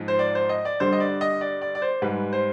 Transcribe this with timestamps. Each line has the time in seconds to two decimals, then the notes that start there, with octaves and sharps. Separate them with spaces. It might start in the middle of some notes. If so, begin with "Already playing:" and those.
Already playing: G#2 F3 G#3
0.08 C5
0.19 D5
0.35 C5
0.49 D#5
0.65 D5
0.80 G2 D3 G3 C5
0.93 D#5
1.00 D5
1.21 D#5
1.41 D5
1.61 D5
1.75 D5
1.82 C5
2.02 G#2 G3 B4
2.33 C5